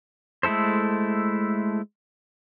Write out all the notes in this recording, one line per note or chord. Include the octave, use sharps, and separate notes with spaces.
G#3 A3 E4 A4 C5